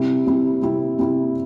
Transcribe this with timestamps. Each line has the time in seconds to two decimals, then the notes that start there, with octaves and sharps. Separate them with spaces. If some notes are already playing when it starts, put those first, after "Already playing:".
Already playing: C3 G3 C4 E4
0.26 C3 G3 C4 E4
0.62 C3 G3 C4 E4
0.98 C3 G3 C4 E4